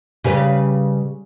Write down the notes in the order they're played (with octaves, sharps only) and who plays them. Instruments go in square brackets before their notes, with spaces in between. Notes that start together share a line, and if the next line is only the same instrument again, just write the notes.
[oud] C#3 G3 B4